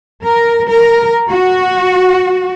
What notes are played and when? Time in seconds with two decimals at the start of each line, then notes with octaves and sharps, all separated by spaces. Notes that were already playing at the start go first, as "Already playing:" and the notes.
0.23 A#4
0.67 A#4
1.30 F#4